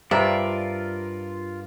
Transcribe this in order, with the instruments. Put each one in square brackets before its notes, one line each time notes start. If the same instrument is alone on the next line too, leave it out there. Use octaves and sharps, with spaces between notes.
[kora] G2 [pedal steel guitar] F4 A#4 D5 [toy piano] C5 A#5 [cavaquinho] E5